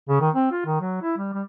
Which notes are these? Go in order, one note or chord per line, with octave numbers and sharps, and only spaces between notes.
C#3
D#3
C4
F4
D#3
F#3
E4
G3
G3